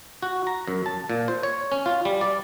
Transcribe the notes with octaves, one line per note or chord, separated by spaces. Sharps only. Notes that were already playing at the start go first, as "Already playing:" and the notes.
F#4
A#5
F#2
A5
A#2
C5
C#5
C#4
F4
G3
D5